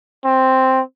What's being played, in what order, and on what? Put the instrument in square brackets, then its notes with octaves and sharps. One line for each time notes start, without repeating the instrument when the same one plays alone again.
[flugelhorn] C4